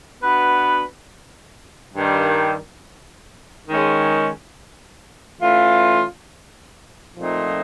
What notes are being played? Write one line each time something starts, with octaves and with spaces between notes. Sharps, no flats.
B3 D4 F#4 B4
G2 D#3 G3
D#3 G#3 C#4
E3 A3 C#4 F4
A#2 F3 A3 C4 D#4